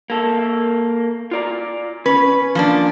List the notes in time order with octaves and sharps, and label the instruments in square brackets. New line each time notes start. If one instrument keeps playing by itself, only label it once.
[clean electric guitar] A#3 A4
F4 D5 A#5
[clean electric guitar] C#4 [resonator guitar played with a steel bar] B4
[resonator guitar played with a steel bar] F3 A#3 D4